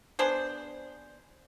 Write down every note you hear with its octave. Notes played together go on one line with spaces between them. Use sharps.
B3 D4 G#4 C5